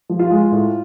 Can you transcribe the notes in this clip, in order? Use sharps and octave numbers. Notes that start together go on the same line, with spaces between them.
F3
F4
G#3
A2